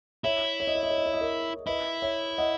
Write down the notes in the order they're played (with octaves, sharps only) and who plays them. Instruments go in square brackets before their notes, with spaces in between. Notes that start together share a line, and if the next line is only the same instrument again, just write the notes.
[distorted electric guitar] E4 [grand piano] C#5 E5
[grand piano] C#5
D#5
C#5
D#5
C#5
D#5
C#5
D#5
A#4 C#5
[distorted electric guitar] E4 [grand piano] B4 D#5
[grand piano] C#5 E5
D#5 F#5